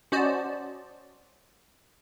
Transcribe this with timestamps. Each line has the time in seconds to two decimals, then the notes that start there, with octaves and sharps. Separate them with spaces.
0.12 C#4 F#4 C5 D5 D#5 A5